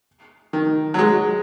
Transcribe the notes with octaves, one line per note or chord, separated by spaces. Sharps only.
D#3
F#3
G#3